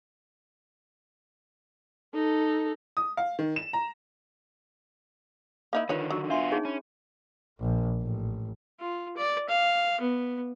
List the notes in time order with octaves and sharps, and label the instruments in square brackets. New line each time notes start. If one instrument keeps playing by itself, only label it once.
[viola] D#4 A4
[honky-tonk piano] D#6
F5
D#3
E7
A#5
[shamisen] A#3 D#4 E4 [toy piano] F5 B5
[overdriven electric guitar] D3 D#3 [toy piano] F4 A#4 [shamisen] B4 C#5
[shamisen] F#3
[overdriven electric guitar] B3 F4 [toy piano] D4 E5 C6
[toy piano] D#4 G#4 C#5
[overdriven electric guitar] C#4 [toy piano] B5
[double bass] A#1
A1
[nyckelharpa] F4
D5
F5
B3